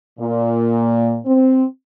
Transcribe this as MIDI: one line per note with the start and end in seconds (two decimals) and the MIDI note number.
0.19 1.18 46
1.26 1.64 60